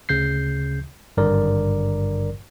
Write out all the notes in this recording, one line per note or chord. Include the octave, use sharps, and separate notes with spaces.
D2 C#3 G6 C7
G#1 G2 D3 A#4 D5